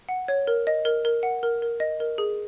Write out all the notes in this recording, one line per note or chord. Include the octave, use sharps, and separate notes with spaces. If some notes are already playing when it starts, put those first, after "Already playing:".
F#5
C#5
A#4
D#5
A#4
A#4
F#5
A#4
A#4
D#5
A#4
G#4